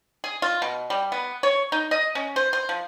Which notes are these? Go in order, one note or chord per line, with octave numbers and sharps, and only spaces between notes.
G#4
F4
B2
G3
B3
C#5
D#4
D#5
C#4
C5
C5
F3